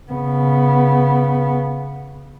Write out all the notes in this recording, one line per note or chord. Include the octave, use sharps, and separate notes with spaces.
C#3 B3